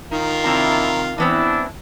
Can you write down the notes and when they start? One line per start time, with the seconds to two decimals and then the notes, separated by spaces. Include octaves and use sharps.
0.11 D#3 D#4 F4 A#4
0.44 C3 C4 D4 E4 A#5
1.18 E3 B3 C4 D4 E4